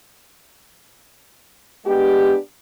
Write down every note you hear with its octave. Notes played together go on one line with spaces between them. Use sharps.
G#3 B3 D4 G4